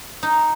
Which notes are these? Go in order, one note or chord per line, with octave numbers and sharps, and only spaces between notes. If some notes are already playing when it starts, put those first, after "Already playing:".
D#4